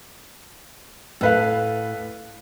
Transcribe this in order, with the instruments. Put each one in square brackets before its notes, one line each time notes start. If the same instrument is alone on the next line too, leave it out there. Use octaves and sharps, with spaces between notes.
[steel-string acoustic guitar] A2 [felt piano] A4 B4 F5